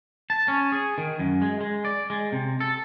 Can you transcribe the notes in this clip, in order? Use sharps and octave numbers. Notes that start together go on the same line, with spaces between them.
A5
C#4
G#4
D#3
F#2
G#3
G#3
D5
G#3
C3
A4